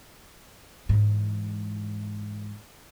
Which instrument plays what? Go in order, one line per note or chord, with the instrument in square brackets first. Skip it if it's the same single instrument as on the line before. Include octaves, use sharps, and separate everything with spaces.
[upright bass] G#2 E3